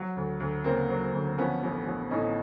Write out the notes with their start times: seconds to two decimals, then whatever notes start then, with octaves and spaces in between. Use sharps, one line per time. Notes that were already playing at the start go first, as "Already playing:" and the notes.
Already playing: F#3
0.17 D2
0.40 D2
0.64 C#3 A#3 C4
0.90 F#3
1.13 D2
1.38 F3 B3 C#4
1.63 A1
1.86 A1
2.11 A2 C#4 D#4